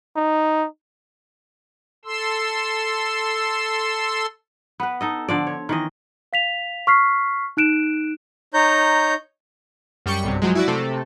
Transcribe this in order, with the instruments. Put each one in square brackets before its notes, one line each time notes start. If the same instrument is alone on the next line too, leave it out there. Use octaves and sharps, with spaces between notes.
[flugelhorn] D#4
[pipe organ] A4 C6 E6
[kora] B3 B4
D#4 A4 D#5
D3 F3 D5
C#5
D#3 E3 D#5
[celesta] F5 B6 F7
C#6 F6 B6 C7
D#4 F#6 D7 E7
[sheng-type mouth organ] D#4 C#5 A#5 G6
[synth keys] F#2 G3 G5 C#6 C#7
B1 G2 C3
F3 F#3 G#3
E4 F#4 D5
C3 A3 C4 A4